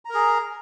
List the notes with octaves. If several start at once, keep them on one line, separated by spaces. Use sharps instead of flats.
G#4 A#4 A#5